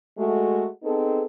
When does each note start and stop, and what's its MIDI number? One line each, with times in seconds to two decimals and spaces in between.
0.18 0.66 56
0.18 0.66 57
0.18 0.66 66
0.84 1.23 59
0.84 1.23 60
0.84 1.23 63
0.84 1.23 68
0.84 1.23 69